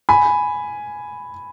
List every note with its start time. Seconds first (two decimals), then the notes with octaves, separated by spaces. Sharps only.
0.09 G#5 B5